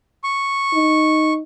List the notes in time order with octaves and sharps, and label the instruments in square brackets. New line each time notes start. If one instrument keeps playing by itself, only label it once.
[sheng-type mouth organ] C#6
[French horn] D#4